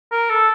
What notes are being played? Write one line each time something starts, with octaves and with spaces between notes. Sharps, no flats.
A#4
A4